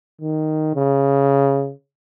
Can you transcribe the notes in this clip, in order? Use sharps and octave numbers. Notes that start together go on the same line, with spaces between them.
D#3
C#3